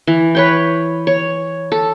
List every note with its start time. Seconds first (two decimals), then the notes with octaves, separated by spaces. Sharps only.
0.07 E3
0.35 B4 C#5 G5
1.07 C#5
1.72 A4